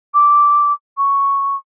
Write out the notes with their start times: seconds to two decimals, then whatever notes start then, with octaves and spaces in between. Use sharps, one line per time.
0.14 D6
0.97 C#6